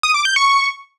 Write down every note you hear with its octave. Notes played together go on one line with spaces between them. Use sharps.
D#6
D6
G6
C#6